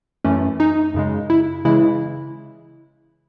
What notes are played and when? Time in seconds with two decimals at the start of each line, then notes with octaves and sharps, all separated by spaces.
0.25 F#2 E3 A3 C#4
0.60 D#4
0.94 F#2 C#3 G#3
1.30 E4
1.65 C#3 E3 G#3 E4